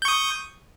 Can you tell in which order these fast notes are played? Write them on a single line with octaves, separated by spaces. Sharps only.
G6 C#6 D#6